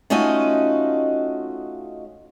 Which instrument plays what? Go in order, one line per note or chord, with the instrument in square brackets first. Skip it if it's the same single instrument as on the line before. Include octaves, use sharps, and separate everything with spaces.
[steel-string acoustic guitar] A3 C#4 D#4 F4 F#4 D#5